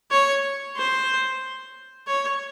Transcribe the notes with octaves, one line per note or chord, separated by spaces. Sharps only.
C#5
C5
C#5